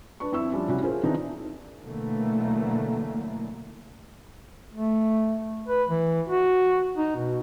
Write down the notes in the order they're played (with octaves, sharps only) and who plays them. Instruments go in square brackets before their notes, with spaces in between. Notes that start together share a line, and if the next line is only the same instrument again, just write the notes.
[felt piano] D4 B4 C#6
F2 C4 E4 C#6 E6
F3 G3 C#4 D4
C2 G3 C#4 E4 F#4
C#4 F4 G#4 A#4 C5
D#3 E3 C4 D4 D#4
[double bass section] B2 D3 E3 F#3 A3 A#3
[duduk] A3
B4
E3
F#4
D#4
B2